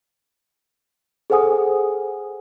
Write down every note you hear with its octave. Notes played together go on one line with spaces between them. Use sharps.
G#4 A4 C5 F#5 G#5 D#6